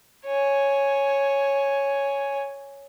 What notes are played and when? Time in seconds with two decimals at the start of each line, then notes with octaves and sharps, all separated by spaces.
0.26 C#5 G#5